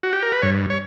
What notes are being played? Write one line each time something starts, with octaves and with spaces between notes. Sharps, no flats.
F#4
G4
A#4
B4
G2 C#5
C#5